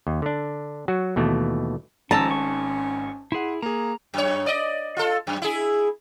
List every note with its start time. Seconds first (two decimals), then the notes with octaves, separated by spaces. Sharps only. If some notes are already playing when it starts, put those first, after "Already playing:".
0.07 D#2
0.22 D3 D4
0.88 F#3 F#4
1.16 D#2 B2 E3 A3
2.11 G#1 G#2 F3 C#4 A5 A#5 E6
2.31 C#6
3.32 E4 G#4 F#5 C6
3.62 A#3 G#4 A#5
4.14 F#2 C#5
4.46 D5 D#5
4.97 F4 A4
5.27 F#2
5.42 E4 G#4